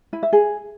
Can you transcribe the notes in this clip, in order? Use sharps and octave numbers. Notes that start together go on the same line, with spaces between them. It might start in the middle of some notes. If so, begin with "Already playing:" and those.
E4
E5
G#4